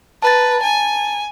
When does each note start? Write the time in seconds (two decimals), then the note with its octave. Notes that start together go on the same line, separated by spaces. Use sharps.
0.22 B4 A5 A#5 A6
0.62 G#5